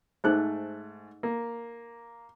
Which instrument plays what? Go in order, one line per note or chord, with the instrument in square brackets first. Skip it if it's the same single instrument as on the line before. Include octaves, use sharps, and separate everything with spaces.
[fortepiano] G#2 A3 F#6 [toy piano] D#4 G#4 C5
[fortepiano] A#3